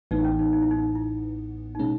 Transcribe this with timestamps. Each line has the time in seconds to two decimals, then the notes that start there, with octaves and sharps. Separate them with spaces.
0.11 A1 A2 E3 B3 D#4
0.25 C#4
0.39 D#4
0.53 D#4
0.62 E4
0.71 D#4
0.95 E4
1.75 D#4
1.79 B2 G#3 C#4 E4